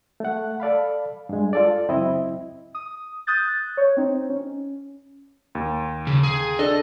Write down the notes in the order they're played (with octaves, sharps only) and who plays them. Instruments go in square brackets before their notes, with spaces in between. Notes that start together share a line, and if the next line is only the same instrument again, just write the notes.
[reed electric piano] A3 F#5
A4 D5 F5 B5
G2 G#3
F4 A4 D5
C#2 F#2 C4 E4 D#5
[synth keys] D#6
D#6 F#6 G6 A6
C#5
C4 D#4
C#4
[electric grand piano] D#2
[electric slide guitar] C#3
G#4
[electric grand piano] D4 A4 [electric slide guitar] D#5